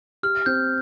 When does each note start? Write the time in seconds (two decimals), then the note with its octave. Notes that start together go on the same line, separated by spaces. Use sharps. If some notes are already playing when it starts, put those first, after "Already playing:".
0.23 G4 F6
0.46 C4 G6